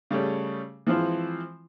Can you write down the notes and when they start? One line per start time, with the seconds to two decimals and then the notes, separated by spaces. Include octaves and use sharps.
0.11 C#3 G3 A3 C#4
0.87 E3 F3 G#3 C4 E4 F4